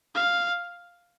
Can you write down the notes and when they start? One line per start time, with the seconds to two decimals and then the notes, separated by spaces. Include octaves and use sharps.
0.15 F5